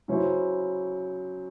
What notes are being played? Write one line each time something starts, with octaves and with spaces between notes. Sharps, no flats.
C#3 F#3 C#4 E4 C5